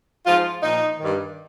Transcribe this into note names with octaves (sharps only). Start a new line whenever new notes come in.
G#2 F3 F4
A#2 F3 D#4
G2 D#3